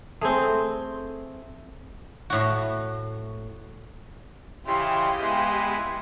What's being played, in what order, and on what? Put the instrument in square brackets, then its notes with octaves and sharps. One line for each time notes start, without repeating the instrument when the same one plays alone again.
[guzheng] A3 [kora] C4 G#4
[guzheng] A2 F#4
[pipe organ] C#3 E3 E4 [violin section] G4 D#5 F5 [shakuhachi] C6
[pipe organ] G#3 B3 E4 [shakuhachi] C6